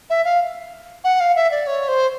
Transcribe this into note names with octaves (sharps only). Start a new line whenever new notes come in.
E5
F5
F#5
F5
E5
D5
C#5
C5